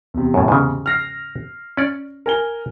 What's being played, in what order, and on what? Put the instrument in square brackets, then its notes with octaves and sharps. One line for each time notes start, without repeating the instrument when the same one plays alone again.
[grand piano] E2 C3
[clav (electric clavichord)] F#2 A2
G#2 C#3
[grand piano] F6 A#6 C7
[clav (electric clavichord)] C#4 D5
[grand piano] A#4 G#5 G7